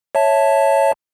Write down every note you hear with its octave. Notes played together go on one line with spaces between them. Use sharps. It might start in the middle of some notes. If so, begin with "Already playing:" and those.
C#5 E5 A5